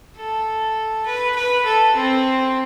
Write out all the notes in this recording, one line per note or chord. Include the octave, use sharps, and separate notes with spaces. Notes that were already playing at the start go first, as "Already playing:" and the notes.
A4
B4
B4
A4
C4